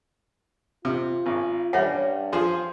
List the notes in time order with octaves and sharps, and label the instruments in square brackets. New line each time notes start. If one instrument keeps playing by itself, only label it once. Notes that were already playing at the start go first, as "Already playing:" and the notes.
[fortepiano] C3 [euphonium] F4
[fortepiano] G#1
[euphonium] G2 [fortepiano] G3 C#4 [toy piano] C#5 E5 F#5
[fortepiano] F3 G#4 C5